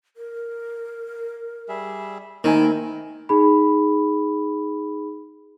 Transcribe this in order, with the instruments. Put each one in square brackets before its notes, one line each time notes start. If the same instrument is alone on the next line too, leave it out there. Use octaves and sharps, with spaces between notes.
[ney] A#4
[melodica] G3 G#4 E5
[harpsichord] D#3 [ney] A3 [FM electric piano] A#3 D#4 G#5 [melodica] C4 E4 A#4
[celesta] D#4 G#4 B5